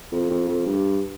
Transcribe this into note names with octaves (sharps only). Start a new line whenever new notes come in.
F2
F2
F2
G2